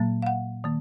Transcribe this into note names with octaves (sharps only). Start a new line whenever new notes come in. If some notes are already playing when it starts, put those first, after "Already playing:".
Already playing: A#2 F#3 A#3
F5
F#5
D#3 A#3